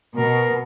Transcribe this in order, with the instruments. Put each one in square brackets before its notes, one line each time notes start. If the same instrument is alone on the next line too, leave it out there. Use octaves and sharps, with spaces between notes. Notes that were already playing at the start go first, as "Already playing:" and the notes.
[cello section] B2 [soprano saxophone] A#4